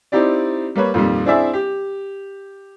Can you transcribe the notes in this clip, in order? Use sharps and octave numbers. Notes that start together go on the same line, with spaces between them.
C4 D#4 E4 G4 D5
G3 A#3 B4 C#5
F2 A#2 D#3 G3
C4 D4 E4 G#4 D5 E5
G4